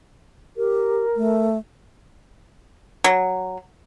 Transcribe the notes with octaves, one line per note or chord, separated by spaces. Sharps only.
G4 A#4
A3
F#3